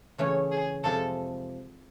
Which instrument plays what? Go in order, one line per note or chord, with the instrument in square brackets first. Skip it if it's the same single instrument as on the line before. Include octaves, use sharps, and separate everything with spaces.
[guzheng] C#3 E3 A3 C#4 [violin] C#5
[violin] G#4
[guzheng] F2 C3 F3 G#3 [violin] A4